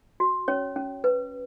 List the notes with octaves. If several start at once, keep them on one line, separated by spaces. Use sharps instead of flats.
F#4
C#4 C#5
C#4
B4